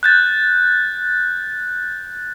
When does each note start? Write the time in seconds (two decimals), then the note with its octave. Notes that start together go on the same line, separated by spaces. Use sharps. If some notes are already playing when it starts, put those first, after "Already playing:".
0.03 F#6 G6 A6